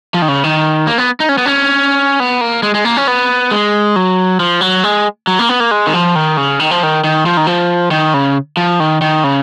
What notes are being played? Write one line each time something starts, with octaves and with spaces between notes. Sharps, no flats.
F3
D#3
C#3
D#3
A#3
B3
D#4
C#4
B3
C#4
B3
A#3
G#3
G#3
A#3
C#4
B3
G#3
F#3
F3
F#3
G#3
F#3
A#3
B3
A#3
G#3
D#3
F3
D#3
C#3
D#3
F3
D#3
D#3
F3
D#3
F3
D#3
C#3
F3
D#3
D#3
C#3